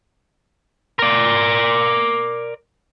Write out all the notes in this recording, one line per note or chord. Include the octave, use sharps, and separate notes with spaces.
A#4 D5